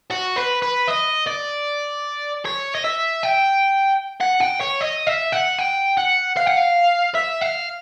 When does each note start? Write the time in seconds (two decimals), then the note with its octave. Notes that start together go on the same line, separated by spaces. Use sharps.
0.11 F#4
0.36 B4
0.62 B4
0.88 D#5
1.27 D5
2.45 C#5
2.75 D#5
2.84 E5
3.23 G5
4.21 F#5
4.41 G5
4.60 C#5
4.81 D#5
5.07 E5
5.32 F#5
5.59 G5
5.97 F#5
6.37 F5
6.46 F#5
6.57 F5
7.15 E5
7.42 F5